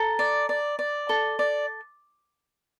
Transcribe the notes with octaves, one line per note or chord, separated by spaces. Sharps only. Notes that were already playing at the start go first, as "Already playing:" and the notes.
Already playing: A4 A#5
D5
D5
D5
A4
D5